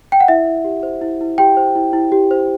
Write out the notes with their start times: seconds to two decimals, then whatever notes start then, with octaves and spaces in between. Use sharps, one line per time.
0.12 G5
0.20 F#5
0.28 E4 E5
0.47 E4
0.64 G4
0.83 C5
1.01 E4
1.21 E4
1.38 G4 G5
1.57 C5
1.76 E4
1.93 E4
2.12 G4
2.31 C5